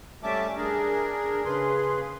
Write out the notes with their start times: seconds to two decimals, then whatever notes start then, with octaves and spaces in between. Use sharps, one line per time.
0.23 G3 A3 C#4 E5 A5 D6
0.56 D4 G#4 A#4
1.45 C#3 G#4 B4 C6